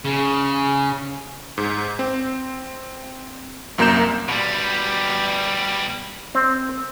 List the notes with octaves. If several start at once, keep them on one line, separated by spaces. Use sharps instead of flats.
C#3
G#2
C4
C2 F#2 A#3 A#5 G6 E7
B2 G3
C4